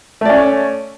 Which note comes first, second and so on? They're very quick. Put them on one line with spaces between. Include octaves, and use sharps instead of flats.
A3 D5 C#4